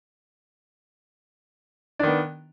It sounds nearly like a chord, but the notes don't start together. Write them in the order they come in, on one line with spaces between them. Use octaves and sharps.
D4 D#3 B3